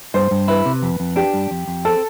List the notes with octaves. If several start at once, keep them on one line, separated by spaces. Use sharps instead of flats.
G2 C5
G2
E4 B4
C3
F2
F2
D4 G4
G2
F2
F2
C4 A4